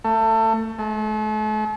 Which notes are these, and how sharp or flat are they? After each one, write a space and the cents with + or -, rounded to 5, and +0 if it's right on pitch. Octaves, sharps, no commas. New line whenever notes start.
A3 +25
A3 -40